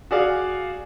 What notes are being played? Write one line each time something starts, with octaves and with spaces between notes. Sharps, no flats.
F#4 G#4 D5 F5